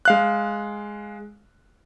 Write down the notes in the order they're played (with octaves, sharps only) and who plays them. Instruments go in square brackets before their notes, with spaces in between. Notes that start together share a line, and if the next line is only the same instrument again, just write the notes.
[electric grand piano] G#3 F5 F#6